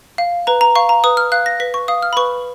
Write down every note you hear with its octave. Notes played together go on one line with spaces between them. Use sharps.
F5
B4 A#5
A#5
F5 C#6
A#5
B4 D#6
F6
F5 F#6
A#6
B4 B6
C#6
F5 D#6
F6
B5
B4 C#6